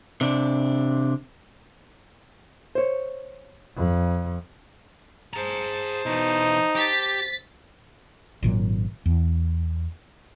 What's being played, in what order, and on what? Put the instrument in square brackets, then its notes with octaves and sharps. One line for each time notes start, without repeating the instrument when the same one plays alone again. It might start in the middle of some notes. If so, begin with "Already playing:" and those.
[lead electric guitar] C3 D4
[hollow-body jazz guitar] C5 C#5
[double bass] F2
[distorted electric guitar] G#4 A#5 [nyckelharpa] C5 A5
[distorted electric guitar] B2 E3 [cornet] D#4
[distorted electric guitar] G4 [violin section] A6 B6
[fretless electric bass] G#1 A#2 C#3 F#3
E2